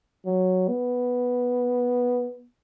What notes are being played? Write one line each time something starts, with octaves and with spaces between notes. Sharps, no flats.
F#3
B3